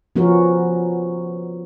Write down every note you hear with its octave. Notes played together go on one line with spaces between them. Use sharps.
F3 B3 C#4 F#4 A#4